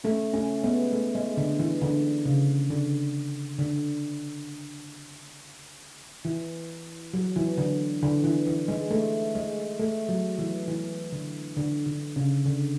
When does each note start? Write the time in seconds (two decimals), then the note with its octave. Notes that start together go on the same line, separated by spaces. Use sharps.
0.04 A3 C#4
0.34 A3 C#4
0.64 G#3 B3
0.93 A3
1.15 G#3
1.37 D3
1.59 E3
1.81 D3
2.26 C#3
2.70 D3
3.59 D3
6.25 E3
7.14 F#3
7.36 E3
7.58 D3
8.02 D3
8.24 E3
8.47 E3
8.68 G#3
8.91 A3
9.35 G#3
9.80 A3
10.09 F#3
10.39 E3
10.68 E3
11.12 D3
11.57 D3
11.86 D3
12.16 C#3
12.45 D3